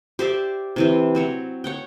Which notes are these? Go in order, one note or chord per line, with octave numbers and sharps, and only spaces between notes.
G4 C5 D5 E5
C3 E3 C4
F#3 C4 C#5
C#5 F#5 G5